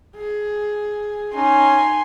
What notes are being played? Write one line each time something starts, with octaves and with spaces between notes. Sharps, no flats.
G#4
C#4 D#4 G#5 C6